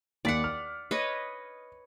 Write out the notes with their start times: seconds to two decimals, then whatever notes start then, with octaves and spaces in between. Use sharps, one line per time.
0.25 D#2 D5 F#5 B6
0.44 F6
0.91 B4 C#5 D#5